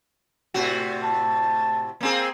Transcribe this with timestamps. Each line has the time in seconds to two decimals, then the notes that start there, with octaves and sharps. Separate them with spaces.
0.54 A2 C3 F#4
1.04 A5
2.00 A#3 C4 G#4